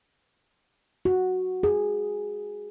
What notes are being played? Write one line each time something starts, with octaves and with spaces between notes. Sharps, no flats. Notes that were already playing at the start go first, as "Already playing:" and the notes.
F#4
G#4